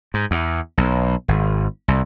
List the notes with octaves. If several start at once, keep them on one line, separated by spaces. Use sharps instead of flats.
G#2
E2
B1
G#1
C2